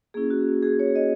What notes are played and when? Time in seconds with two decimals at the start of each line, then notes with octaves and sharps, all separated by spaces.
0.14 A#3 C#4 E4 G#4
0.30 F#4
0.62 G#4
0.79 C#5
0.95 D#5